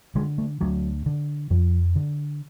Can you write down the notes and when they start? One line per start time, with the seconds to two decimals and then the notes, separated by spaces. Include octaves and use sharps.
0.15 D3 G#3
0.38 A3
0.61 D2 F#3
1.06 D3
1.50 F2 F3
1.96 D3